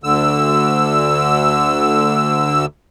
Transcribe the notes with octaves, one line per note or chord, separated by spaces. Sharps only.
D2 D3 E6